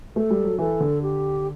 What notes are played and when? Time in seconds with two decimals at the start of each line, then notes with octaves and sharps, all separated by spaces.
0.16 A3 A4
0.30 G3
0.44 F#3
0.59 E3 A4
0.80 D3
1.02 G4